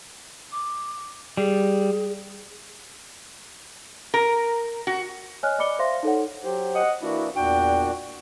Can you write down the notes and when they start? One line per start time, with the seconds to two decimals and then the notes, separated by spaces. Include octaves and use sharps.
0.52 D6
1.37 G3 G#4
4.14 A#4
4.87 F#4
5.43 C#5 D#5 G#5 F6 F#6
5.58 D5 D#5 B5 D6 C#7 G7
5.79 C5 E5 F5 C6 A#6
6.03 D#4 A4 C#5 F#5
6.45 F#3 G4 C5
6.74 D#5 F#5
7.02 E3 A#3 D4 E4 F#4
7.36 E2 A#2 D4 F#4 G5